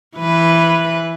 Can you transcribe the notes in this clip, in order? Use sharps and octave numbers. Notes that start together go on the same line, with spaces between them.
E3 B4